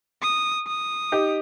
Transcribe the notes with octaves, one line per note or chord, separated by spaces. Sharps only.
D#6
D#6
D#4 G4